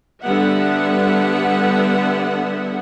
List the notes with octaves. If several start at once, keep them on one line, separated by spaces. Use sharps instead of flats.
D3 G3 B3 E5 F#5